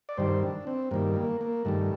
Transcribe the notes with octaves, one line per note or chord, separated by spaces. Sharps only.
D5
G2 D#3 G3 C5
D4
C4
G2 D#3 G3 A#3
A#3
A#3
G2 D#3 G3 A3